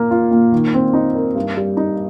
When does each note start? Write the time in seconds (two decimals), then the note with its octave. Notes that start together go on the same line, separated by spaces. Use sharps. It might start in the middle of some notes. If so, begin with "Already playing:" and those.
Already playing: A#2 A#3
0.11 F4
0.31 A#2
0.52 D#3
0.74 C4
0.94 D#4
1.15 A#4
1.35 G2
1.57 G3
1.77 D#4